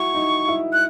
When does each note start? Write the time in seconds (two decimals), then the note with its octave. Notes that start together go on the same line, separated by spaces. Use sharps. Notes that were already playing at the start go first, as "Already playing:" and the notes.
Already playing: E4 F#4 C#6
0.15 D#4
0.48 E4
0.73 F#6